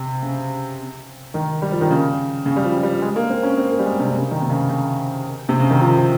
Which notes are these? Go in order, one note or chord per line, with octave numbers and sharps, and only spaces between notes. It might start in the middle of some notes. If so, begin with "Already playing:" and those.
Already playing: C3
C#3
D#3
G3
F3
D#3
C#3
C#3
G3
F3
F3
G3
G#3
A#3
C4
C#4
C4
A#3
G3
G#3
C3
C#3
D#3
C3
C#3
C#3
C3
C#3
D#3
F3
F3